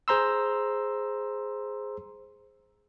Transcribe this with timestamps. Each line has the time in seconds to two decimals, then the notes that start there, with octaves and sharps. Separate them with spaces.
0.08 G#4 C5 A#5 C6 E6